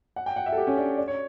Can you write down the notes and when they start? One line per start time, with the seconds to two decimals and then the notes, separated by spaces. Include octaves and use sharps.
0.16 F#5
0.26 G5
0.36 F#5
0.46 E5
0.52 A4
0.57 G4
0.67 C#4
0.77 D4
0.97 D5
1.08 C#5